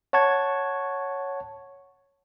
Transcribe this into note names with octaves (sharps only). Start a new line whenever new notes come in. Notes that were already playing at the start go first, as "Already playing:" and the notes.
C#5 F#5 A5 C#6 G#6